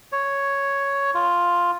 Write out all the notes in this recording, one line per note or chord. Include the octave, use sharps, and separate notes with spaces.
C#5
F4